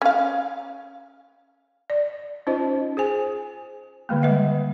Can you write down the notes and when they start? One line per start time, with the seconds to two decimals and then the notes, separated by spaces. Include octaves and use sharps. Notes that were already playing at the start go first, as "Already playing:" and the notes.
0.02 C#4 F5
1.90 D5
2.47 C#4 D#4 F4 C5 D#5
2.97 G#4 C5 G#5
4.09 D3 D#3 G#3 A#3
4.22 G3 B4 E5 F#5